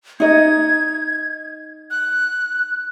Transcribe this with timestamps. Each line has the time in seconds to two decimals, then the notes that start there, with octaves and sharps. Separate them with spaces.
0.20 D#4 D#5 G#6
1.91 F#6